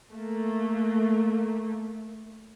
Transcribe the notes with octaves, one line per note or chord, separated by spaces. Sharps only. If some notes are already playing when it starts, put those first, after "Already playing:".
A3 A#3